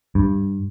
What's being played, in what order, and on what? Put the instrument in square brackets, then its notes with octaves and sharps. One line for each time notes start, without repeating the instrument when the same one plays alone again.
[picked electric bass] G2